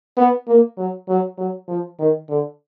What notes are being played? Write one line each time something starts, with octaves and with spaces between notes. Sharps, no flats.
B3
A#3
F#3
F#3
F#3
F3
D#3
D3